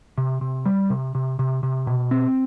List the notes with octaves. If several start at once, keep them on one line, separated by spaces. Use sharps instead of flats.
C3
C3
G3
C3
C3
C3
C3
B2
C4